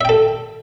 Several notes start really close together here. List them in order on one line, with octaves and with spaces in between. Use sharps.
E5 G5 A4